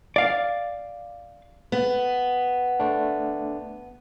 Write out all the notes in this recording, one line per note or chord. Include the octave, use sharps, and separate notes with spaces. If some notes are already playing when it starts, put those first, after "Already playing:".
D5 F5
B3
A3 D4